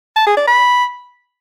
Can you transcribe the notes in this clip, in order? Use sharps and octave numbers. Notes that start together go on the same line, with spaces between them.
A5
G#4
D5
B5